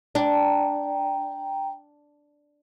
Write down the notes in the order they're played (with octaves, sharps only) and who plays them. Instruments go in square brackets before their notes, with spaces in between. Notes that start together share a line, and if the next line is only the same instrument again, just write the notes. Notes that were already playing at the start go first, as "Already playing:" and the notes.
[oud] D4 [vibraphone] G5 A#5